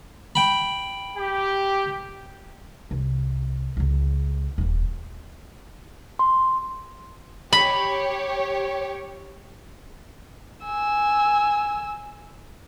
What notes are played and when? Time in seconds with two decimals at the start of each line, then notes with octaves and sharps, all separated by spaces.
0.35 G5 B5
1.17 G4
2.91 C2
3.77 C#2 C#3
4.58 D#1 A#3
6.19 C6
7.52 G4 C#5 B5
10.65 G#5 E6